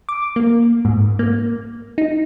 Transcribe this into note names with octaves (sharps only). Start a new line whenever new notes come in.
D6
A#3
G#2
A#3
D#4